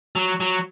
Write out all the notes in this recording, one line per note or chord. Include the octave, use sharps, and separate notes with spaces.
F#3
F#3